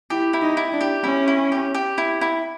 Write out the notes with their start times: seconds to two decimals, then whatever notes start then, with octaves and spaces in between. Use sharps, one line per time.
0.10 E4 G4
0.33 E4
0.42 D#4
0.57 E4
0.73 D4
0.81 G4
1.04 C#4 E4
1.28 E4
1.52 G4
1.74 G4
1.98 E4
2.21 E4